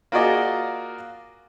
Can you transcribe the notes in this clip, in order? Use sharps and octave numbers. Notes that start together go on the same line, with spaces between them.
A#3 F4 F#4 G#4 D5 D#5